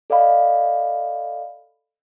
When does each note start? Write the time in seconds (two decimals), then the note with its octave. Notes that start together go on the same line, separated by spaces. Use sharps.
0.10 A4 D5 D#5 F5 B5